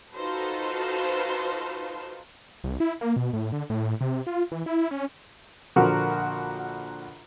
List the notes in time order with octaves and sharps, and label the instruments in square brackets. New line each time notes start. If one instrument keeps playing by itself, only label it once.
[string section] D#4 F4 F#4 A4 B4 C5
[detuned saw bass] C2
E4
A#3
B2
A2
D3
A2
C3
F4
E3
E4
C#4
[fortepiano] A#1 D3 F3 F#4 A#4